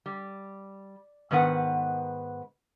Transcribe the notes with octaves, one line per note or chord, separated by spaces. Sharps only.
G3
G#2 D#3 B3 B4 F#5